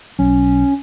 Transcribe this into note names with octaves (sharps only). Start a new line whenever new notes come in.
B1 F#3 C#4